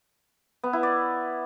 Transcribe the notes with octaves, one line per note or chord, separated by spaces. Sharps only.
B3
E4
D5